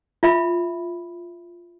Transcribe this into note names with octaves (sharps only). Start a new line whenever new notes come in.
F4 E5 B5